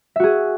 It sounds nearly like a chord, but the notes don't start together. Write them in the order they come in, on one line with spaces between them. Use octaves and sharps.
E5 F#4 G#4